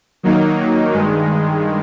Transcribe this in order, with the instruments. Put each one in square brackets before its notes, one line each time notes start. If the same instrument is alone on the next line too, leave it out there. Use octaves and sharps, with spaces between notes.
[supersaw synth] D#3 F#3 A#3 D#4
G2 D#3 G#3